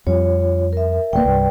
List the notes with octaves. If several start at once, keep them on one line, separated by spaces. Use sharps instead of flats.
F2 G3 F4 C#5
A#4 E5
D1 G3 A#3 B4 D5 G5
C2 G2